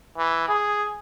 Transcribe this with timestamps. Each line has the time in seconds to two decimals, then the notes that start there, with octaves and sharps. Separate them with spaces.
0.17 E3
0.49 G#4